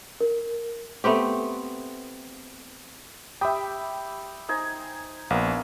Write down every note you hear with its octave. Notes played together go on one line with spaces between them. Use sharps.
A#4
A3 B3 C4 G4
G4 E5 G5 B5 D#6
D#4 C5 G#5
A#1 A#3 B3